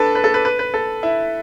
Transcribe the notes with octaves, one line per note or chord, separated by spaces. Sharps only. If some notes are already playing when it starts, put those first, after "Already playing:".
Already playing: D4 A4 B4
B4
A4
B4
B4
B4
A4
E4